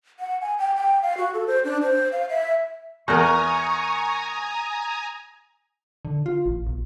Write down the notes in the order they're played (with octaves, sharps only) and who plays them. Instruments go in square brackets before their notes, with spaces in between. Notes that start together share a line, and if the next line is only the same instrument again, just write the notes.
[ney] F#5
G#5
G5
G5
F5
F#4
A4
C5
D4
C5
F5
E5
[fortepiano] E2 [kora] F#4 A#4 [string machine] G#5 A#5 D#6 [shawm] C#6
[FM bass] D3
F4
A1
B1